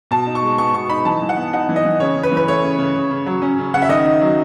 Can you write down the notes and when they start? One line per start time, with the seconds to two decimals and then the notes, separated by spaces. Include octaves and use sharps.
0.11 B2 A5
0.27 D#4
0.35 C#6
0.43 G#3
0.58 B3 C#6
0.74 B2 C#6
0.90 D#4 B5
1.05 E3 A5
1.22 E3
1.29 F#5
1.37 B3
1.53 D#4 F#5
1.69 E3
1.76 D#5
1.85 E3
2.00 C#3 C#5
2.16 C#3
2.23 B4
2.32 E3
2.37 B4
2.47 A3 C#5
2.63 C#3
2.79 C#3
2.96 C#3
3.11 C#3
3.26 F#3
3.42 C#4
3.59 C#3
3.74 C#3 F#5
3.82 E5
3.89 D#3 D#5
4.05 D#4
4.21 F#3